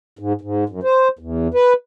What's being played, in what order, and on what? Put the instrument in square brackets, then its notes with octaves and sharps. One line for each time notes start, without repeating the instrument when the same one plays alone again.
[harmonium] G#2
G#2
F#2
C5
E2
B4